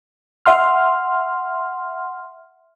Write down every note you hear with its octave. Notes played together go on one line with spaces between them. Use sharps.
E5 F#5 C6 F6